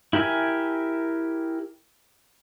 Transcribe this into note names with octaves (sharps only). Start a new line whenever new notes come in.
E4 G4 A#4 E5 G#5